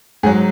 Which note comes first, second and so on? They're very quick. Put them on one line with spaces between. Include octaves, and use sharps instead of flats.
G#2 G#4 F#3